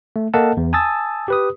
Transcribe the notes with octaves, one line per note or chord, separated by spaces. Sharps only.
A3
A#3 A4 A#4 D#5 F#5 A5
E2
G#5 A5 D#6 E6 A6
G4 B4 D#6